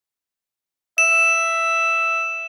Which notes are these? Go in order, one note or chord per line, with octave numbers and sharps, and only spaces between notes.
E5 E7